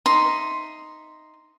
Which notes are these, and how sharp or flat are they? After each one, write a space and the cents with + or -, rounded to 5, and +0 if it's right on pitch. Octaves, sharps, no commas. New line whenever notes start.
D#4 +0 E5 +0 C6 +0